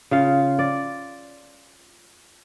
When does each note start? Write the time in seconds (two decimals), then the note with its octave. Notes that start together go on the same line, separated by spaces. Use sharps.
0.11 C#3 F4 F5
0.59 D5